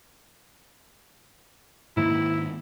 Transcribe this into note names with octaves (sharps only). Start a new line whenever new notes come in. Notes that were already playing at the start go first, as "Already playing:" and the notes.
G#2 D#3 A#3 E4